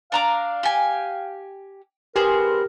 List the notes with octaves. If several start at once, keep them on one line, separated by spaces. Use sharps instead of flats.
D4 F5 A#5 D6
G4 G#5
B3 G4 G#4 A#4 C5